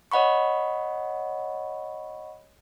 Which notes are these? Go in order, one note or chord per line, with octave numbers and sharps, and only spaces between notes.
C#5 D#5 F#5 B5 C#6